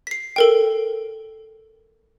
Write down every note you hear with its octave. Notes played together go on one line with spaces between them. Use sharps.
B6 C7
A4 A#4 G5